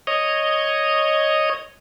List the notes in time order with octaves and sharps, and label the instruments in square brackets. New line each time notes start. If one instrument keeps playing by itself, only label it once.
[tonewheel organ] C#5 D#5